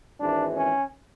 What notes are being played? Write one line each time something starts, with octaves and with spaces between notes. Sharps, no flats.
G#1 G#2 E3 D4
C#4